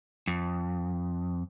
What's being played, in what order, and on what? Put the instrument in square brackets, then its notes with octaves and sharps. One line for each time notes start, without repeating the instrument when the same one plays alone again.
[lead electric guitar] F2